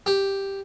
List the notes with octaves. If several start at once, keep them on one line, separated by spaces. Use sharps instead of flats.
G4